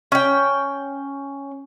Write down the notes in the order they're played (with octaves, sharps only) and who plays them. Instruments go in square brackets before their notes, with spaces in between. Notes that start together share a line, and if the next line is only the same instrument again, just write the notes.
[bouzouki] C#4 G5